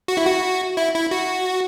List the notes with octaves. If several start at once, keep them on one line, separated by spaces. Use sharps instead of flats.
F#4
E4
F#4
E4
E4
F#4